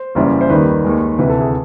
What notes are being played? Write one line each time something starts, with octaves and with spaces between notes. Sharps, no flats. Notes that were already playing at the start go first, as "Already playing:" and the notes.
Already playing: C5
F#1 F#2 C#3 E3 G3
C5
D#2 D#3 G3 B4
D#2 D#3 G#3
D2 C3 E3 B4
A4
G#4